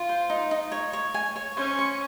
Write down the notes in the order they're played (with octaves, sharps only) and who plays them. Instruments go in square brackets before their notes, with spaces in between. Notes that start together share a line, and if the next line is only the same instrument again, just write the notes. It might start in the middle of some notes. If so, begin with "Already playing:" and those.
Already playing: [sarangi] F4
[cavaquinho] C5
D#4
D#4
C#5
C#5
G#5
C#5
[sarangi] C#4 [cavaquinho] C5
[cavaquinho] C#6